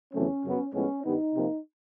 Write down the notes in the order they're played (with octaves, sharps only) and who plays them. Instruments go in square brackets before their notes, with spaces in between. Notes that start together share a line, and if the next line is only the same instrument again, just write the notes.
[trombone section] E2 C#3 F#3 A3 C4 C#4
F#2 C#3 F#3 B3
A2 F3 G#3 B3 C#4
G2 D#3 G3 B3 D#4
C3 F3 A#3